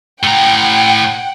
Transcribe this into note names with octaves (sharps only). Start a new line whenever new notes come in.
A2 F#5 G5 A#5